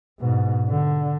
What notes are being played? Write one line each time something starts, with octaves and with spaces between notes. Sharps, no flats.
G#2 B2
D3